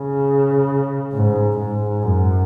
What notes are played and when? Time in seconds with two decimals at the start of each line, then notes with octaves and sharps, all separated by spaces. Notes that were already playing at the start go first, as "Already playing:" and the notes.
Already playing: C#3
1.13 G#2
1.58 G#2
2.03 F#2